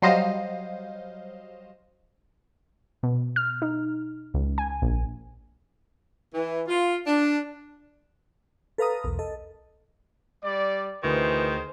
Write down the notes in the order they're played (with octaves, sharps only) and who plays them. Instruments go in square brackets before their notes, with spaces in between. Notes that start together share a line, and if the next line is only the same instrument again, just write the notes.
[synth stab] F#3 G3 C5 D#5 F5
[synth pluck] B2
F6
D#4
C#2
G#5
A#1
[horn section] E3
F4
D4
[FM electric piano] A4 B4 F5 A#5 D#6
B1 E2 A#4
A4 D#5
[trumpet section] G3 D5
[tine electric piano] D2 C#6 [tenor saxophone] D#3 [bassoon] E3 [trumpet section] G#4 C5